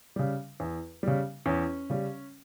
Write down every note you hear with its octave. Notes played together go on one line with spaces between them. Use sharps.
C#3 G3
E2
C#3 G3
E2 C#4
C#3 G3